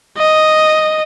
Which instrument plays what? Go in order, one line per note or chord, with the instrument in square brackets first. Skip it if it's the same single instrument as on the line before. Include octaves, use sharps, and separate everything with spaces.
[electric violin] D#5